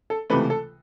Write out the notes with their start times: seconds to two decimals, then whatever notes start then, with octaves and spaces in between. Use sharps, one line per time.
0.10 A4
0.30 C#2 C3 E3 A3 B4
0.50 A4